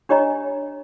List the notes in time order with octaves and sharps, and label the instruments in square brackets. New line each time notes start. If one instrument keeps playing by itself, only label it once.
[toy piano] D4 G4 C#5 D#5 A#5